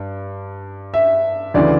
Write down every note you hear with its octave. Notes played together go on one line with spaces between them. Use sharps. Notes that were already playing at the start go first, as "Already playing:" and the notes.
Already playing: G2
E5
D2 C#3 E3 D5